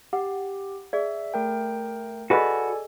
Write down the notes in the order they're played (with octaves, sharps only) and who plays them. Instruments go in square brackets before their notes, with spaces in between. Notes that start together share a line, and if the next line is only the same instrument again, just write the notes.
[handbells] G4 [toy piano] F#5
[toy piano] G#4 D5 [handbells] E5
[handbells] A3 A#4 G5
[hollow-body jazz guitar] F#4 B4 [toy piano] G#4 D#5 [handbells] A4 D5 G#5